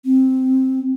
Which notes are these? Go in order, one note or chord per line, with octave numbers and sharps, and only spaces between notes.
C4